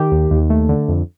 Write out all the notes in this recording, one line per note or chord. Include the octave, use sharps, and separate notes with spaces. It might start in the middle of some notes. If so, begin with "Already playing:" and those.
Already playing: D#3 G4
D#2
D#2
A3
D3
F2